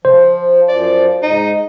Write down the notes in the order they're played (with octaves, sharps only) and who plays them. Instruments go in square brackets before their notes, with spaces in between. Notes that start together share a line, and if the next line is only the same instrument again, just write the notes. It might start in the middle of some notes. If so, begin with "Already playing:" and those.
[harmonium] F3 [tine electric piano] C5
[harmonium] F#2 F3 [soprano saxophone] D5
[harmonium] G#2 [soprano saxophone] D#4